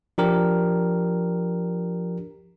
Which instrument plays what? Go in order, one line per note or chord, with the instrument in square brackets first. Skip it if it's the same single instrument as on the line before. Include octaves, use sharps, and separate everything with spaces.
[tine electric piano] F3 D4 G4 A#4